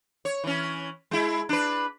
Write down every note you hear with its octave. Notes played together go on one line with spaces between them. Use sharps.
C#5
E3 C#4
G#3 E4
D4 B4